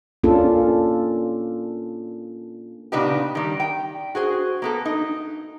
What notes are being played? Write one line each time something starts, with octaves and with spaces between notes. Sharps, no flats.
A#3 C#4 D4 F4 A4
A#2 C#3 B3 D4 D#4 G4
D#3 G3
G5
F#4 G#4 C5
A#3 B3 A4
D#4